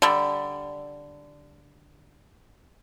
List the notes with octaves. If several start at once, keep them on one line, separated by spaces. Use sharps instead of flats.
D3 G3